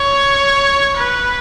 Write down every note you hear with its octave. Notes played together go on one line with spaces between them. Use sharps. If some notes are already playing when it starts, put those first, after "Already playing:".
Already playing: C#5
B4